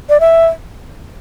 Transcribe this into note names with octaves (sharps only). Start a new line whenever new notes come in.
D5
E5